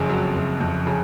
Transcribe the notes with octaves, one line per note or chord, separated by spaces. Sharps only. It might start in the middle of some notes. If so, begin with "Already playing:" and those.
Already playing: F#1 F2 C#3
F#3
F#1
F2
C#3